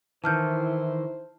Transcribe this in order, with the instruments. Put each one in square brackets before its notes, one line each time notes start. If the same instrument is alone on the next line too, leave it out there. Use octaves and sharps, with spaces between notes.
[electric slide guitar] D#3 E3 [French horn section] E4 C5 [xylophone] A5 F6 G6